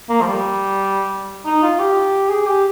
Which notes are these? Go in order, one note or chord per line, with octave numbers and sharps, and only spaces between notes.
A#3
F3
G3
D#4
F4
G4
G#4
G4